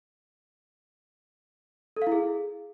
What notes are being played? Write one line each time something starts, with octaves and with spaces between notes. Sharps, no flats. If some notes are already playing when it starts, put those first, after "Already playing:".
A4
F5
E4
G#4